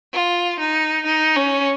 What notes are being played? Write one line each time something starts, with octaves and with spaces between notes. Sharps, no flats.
F4
D#4
D#4
C#4